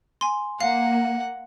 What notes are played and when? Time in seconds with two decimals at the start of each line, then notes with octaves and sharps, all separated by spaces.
0.21 G#5 C6
0.60 A#3 F5 F#5 C7